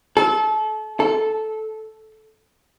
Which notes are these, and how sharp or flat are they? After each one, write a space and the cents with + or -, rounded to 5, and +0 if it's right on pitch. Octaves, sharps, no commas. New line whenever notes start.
A4 -30
A4 -10